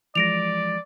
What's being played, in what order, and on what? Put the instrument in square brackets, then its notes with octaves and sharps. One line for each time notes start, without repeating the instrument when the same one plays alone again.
[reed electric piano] E3 F3 G#3 [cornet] D5 [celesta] A#6 D7 F7